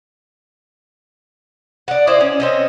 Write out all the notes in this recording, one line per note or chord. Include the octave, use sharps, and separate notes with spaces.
D5 F#5
E4 C5 D5 D#5
C#4
C4 C#4 D#5